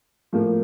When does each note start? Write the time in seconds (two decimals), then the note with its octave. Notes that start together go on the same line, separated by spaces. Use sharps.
0.33 A2 F3 A#3